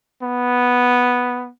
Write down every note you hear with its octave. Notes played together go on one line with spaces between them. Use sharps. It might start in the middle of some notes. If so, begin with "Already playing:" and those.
B3